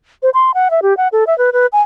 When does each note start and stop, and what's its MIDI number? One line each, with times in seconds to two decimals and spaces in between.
0.23 0.30 72
0.34 0.51 84
0.54 0.68 78
0.71 0.80 76
0.82 0.96 67
0.97 1.08 78
1.12 1.24 69
1.27 1.36 76
1.38 1.50 71
1.53 1.66 71
1.73 1.82 80